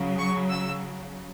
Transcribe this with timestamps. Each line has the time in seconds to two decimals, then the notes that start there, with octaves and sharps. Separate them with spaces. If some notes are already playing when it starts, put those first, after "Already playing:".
Already playing: C#3 F#3
0.19 C#6
0.50 E6